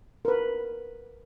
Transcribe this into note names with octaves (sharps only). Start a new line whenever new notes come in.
A#4 B4